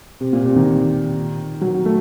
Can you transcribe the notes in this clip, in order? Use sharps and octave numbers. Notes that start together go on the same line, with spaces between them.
C3
A#2
C3
D#3
F#3
A3